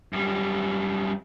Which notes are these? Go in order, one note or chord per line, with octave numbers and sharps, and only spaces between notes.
F#2 G3